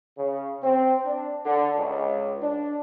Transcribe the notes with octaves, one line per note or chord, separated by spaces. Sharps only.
C#3
C4
D4
D3
C#2
D4